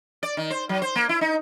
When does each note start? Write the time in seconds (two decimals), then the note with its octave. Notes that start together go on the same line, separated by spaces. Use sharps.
0.23 D5
0.37 D#3
0.50 C5
0.69 F#3
0.82 C5
0.96 A#3
1.09 E4
1.21 D#4